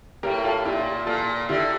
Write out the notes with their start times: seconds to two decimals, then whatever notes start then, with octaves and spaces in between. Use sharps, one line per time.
0.23 A2 G4 A#4
0.44 F4 A4
0.65 A#2 E4 G4
1.07 A#2 F4 A4
1.49 D3 E4 G4